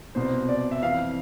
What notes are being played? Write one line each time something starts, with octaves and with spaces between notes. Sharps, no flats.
C2 B2 C5
D5
E5
F2 E3 F5